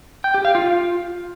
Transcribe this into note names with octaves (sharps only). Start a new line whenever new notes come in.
G5
G4
F5
F4